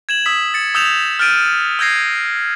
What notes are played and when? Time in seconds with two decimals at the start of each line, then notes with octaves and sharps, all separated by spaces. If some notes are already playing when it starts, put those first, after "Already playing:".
0.09 G#6 E7 F#7
0.26 D#6 E6 B6
0.54 A6 C#7
0.75 D#6 E6 G6 E7 F7
1.19 F6 G6 A6 D7 D#7
1.79 E6 G6 G#6 A#6 C7